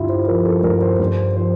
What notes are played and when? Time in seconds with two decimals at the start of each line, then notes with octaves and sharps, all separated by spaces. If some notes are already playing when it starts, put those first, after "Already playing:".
Already playing: G2 D3 E4 F4 G4
0.09 C5
0.28 F3 A#4
0.46 A4
0.63 G2 A#4
0.82 C5
0.99 G2 C5
1.36 F3 C5